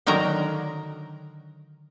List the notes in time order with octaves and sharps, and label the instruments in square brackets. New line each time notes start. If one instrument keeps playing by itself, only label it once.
[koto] D3 D#3 F#3 A#4 A#5